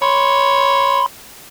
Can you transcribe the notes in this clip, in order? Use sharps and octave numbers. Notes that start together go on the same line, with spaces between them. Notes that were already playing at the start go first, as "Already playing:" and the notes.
C#5 B5 C6